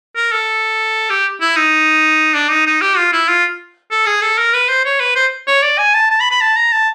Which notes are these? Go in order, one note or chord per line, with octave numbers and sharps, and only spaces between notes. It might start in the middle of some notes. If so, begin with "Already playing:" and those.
A#4
A4
G4
E4
D#4
D4
D#4
D#4
G4
F4
E4
F4
A4
G#4
A4
A#4
B4
C5
C#5
B4
C5
C#5
D5
G#5
A5
A5
B5
B5
A5
A#5
A5